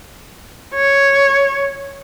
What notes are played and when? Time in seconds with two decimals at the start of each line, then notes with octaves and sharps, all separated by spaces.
0.74 C#5